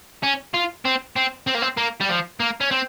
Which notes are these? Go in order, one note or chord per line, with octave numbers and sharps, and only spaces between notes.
C#4
F4
C4
C4
C4
A#3
C4
A#3
G3
F3
A#3
C#4
C4